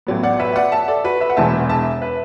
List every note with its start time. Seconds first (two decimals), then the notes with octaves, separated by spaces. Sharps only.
0.07 A1 A2 F#3 B3
0.23 D5 F#5
0.40 B4 E5
0.56 D5 F#5
0.72 E5 A5
0.88 A4 D5
1.04 F#4 B4
1.20 B4 E5
1.30 F#5
1.37 E1 E2 B2 E5 A5
1.69 E5 A5
2.01 B4 E5